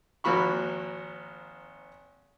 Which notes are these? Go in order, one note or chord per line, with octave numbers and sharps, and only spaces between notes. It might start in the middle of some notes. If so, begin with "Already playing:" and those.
G#1 F3 A#3 F#4 B5 C#6